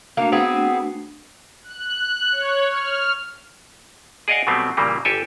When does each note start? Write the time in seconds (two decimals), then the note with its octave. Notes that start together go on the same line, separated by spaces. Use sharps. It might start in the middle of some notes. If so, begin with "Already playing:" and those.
0.17 A3 A#3 D4 F#4
0.32 B3 C4 G#4
1.64 F#6
2.32 C#5
2.68 F6
4.28 G#4 D5 D#5 F5 F#5 G#5
4.47 B2 F#3 G3 A3 B3 C4
4.77 A#2 C#3 E3 G3 A#3
5.05 G1 G4 A4 G#5